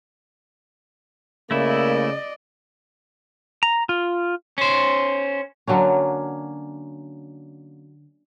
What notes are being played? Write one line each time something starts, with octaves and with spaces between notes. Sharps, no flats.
C#3 A3 A#3 E4 D5 D#5
A#5
F4
C#4 C5
D3 F#3 A#3 C#4